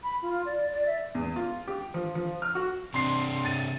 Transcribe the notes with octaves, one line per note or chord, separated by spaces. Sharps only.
B5
F4
D5
D5
E5
E2
F4
G4
F3
F3
F6
F#4
C3 D4 C6 C7
A6 D#7